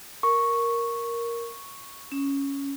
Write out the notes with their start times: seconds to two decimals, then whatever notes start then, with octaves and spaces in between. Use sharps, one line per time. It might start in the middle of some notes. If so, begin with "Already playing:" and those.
0.23 A#4 C#6
2.12 C#4